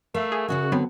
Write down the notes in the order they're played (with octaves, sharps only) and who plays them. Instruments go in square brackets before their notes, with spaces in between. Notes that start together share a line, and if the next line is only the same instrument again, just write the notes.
[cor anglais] A3 [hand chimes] A#4 [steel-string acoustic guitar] E5 F5
[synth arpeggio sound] G#4
[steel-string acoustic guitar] C#3 C#4 E5 [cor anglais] F#4
[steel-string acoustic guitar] D3 [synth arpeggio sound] F#3 B3 C4